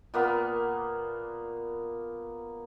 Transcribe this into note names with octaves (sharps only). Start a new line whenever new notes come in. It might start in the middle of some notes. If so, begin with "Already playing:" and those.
A#2 A#3 B3